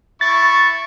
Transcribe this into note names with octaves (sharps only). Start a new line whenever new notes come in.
E4 C#6 A6